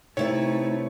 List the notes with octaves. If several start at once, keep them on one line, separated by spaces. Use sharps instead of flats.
C3 A3 D#4 E4 B4 C#5